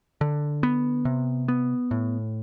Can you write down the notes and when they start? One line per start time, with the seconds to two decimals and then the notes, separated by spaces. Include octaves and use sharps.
0.21 D3
0.63 B3
1.05 C3
1.48 B3
1.91 A2